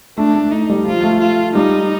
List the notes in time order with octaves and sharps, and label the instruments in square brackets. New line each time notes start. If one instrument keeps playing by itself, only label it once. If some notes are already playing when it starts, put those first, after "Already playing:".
[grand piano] A3 [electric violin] D4
[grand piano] A3
[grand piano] A3 [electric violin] D#4
[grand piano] G3
[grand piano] F3 [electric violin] F4
[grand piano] A3
[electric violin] F4
[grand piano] G3 [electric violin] D#4